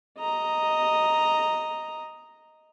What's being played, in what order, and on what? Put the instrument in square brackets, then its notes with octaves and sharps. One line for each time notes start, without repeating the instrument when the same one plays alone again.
[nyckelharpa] D#5 A#5